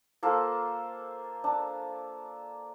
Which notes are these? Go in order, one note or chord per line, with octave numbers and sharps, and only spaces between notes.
A#3 F4 A4 C5
D4